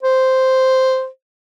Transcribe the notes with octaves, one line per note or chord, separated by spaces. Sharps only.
C5